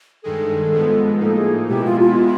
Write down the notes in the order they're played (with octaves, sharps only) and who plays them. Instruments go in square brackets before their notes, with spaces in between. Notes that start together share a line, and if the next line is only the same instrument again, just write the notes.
[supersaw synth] G2 D#3 G#3 [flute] A4
[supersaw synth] G#2 F3 G#3 B3
[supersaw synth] A2 F3 A#3 D#4 [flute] A4
[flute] G#4
[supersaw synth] B2 G#3 B3 E4 [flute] G4
[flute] F4
F4